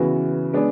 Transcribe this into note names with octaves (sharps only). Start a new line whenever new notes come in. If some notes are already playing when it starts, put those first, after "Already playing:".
Already playing: C#3 E3 B3 F#4
G#3 B3 D4 G#4